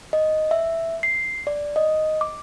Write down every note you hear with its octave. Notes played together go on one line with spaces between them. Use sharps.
D#5
E5
C7
D5
D#5
D6